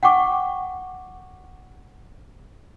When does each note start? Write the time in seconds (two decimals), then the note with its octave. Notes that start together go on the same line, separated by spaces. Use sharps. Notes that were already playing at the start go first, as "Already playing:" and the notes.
0.03 F#5 G5 C#6 D6